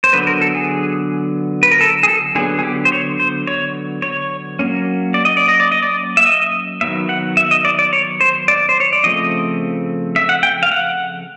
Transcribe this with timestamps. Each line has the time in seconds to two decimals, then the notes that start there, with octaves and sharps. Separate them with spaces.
0.04 C5
0.13 D3 F#3 B3 B4
0.27 A#4
0.41 A4
0.55 G#4
1.63 B4
1.71 A#4
1.81 A4
2.03 G#4
2.08 A4
2.35 D3 F#3 B3 G#4
2.59 G#4
2.63 G4
2.85 C5
2.92 C#5
3.19 C5
3.47 C#5
4.02 C#5
4.59 F#3 A#3 C#4
5.14 D5
5.25 D#5
5.37 D5
5.48 D#5
5.60 D5
5.72 D#5
5.82 D5
6.17 E5
6.26 D#5
6.81 D#3 F#3 B3 E5
7.09 F#5
7.37 E5
7.51 D#5
7.65 D5
7.79 D5
7.93 C#5
8.21 C5
8.48 D5
8.69 C5
8.80 C#5
8.93 D5
9.04 C#3 F3 A3 C4 D#5
10.16 E5
10.29 F#5
10.43 G5
10.63 F5
10.72 F#5